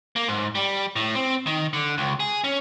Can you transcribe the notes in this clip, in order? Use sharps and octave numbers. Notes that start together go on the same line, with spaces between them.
A#3
G#2
G3
A2
C4
D#3
D3
C#2
G#4
C#4